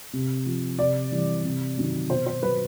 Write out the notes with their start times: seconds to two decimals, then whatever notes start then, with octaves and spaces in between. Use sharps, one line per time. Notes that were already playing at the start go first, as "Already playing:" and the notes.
0.13 C3
0.46 F3
0.79 C3 D5
1.12 E3 G3
1.44 C3
1.78 D#3 F#3
2.10 B2 C5
2.26 C5
2.43 F#3 B4